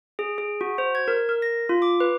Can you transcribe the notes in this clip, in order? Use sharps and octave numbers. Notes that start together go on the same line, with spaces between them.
G#4
G#4
F#4
C5
G#6
A#4
A#4
A#6
F4
D6
B4